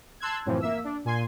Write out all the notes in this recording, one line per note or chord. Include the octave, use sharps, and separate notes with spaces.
A5 C6 E6 F#6 G#6
F#2 A2 C3 E3 F3
A#3 E5 E6
D4
A#2 G#5 C6